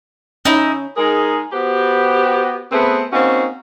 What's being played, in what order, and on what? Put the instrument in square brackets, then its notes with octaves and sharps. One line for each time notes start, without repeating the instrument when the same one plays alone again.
[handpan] C#4 [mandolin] D#4 E4
[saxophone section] G#3 D#4 G#4 A#4
B3 F#4 G4 B4 C5
A3 B3 C4 G#4 B4
A#3 C4 C#4 D#4 F#4